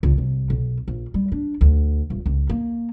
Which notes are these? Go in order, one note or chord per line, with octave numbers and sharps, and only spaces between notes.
C#2
C2
B1
A#1
G3
D4
D2
D#1
C#2
A#3